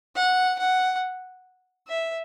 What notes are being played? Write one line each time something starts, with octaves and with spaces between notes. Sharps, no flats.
F#5
F#5
E5